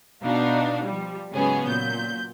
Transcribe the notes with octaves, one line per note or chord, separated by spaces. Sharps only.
B2 D4 D#4 F5
F3 G3
G#2 C#3 F#3 B3 C#4 G#4
A#2 F#3 G6